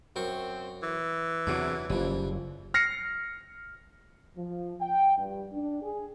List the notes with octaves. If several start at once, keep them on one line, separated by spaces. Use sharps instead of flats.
F#2 C4 A#4 C#6
E3
E2 C3 F#3 D4
F#1 F3 G3
F6 A#6 C7 C#7
F3
G5
G2
D4
G#4